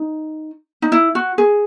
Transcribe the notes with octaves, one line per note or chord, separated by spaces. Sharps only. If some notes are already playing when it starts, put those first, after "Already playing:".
Already playing: D#4
D#4
E4
F#4
G#4